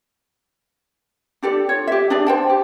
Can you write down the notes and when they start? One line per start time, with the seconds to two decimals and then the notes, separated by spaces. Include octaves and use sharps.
1.43 D4 G4 A4 D5
1.69 F4 C#5
1.87 G4 E5
2.10 D4 G4 G#4 D5
2.27 C5 G5 A5
2.50 G4